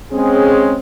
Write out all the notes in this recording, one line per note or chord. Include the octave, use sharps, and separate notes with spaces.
G#3 C4 C#4 G#4